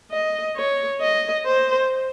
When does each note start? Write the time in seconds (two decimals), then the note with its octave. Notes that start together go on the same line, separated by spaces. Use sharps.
0.11 D#5
0.56 C#5
1.01 D#5
1.46 C5